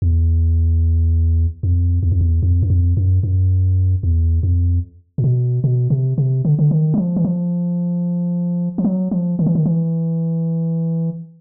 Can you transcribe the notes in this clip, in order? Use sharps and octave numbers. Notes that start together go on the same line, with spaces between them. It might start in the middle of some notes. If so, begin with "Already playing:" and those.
E2
F2
E2
F2
E2
F2
F#2
F2
F#2
F#2
E2
F2
A#2
B2
B2
C3
C3
D3
D3
D#3
F#3
F3
E3
F3
F3
F#3
F3
D#3
E3
D#3
E3